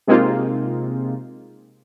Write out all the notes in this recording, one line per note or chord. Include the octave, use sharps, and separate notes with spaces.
C3 G#3 A#3 C4 D#4 F4